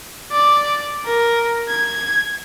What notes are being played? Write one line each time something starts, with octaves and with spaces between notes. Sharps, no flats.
D5
A#4
G#6